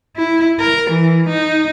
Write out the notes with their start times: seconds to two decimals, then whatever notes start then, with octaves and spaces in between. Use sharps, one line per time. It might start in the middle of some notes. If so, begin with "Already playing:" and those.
0.16 E4
0.60 A#4
0.90 E3
1.29 D#4